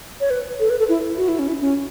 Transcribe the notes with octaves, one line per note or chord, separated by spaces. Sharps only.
C#5
B4
A4
B4
A4
E4
F#4
E4
C#4
E4
C#4